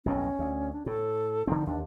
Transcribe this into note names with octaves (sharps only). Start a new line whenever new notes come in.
B1 F2 A2 C#4
D2
D4
A2 A4
D3 F3 C4 D#4
D#2 D4